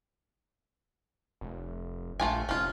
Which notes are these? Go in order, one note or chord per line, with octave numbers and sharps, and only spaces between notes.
F1
A#1 A3 F4 G#5
F1 C#4 F4